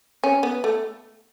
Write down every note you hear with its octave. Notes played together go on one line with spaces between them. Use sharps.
C#4
B3
A3